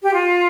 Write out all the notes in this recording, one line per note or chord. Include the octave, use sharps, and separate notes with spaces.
G4
F4